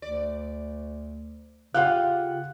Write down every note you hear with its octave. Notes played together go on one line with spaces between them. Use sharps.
D2 D5
C#3 F4 G4 F5 F#5 F#6